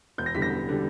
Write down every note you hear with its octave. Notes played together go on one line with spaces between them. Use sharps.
E1 G6
A#6
E2 D3 G3 B6
A#6
E1
D3 G3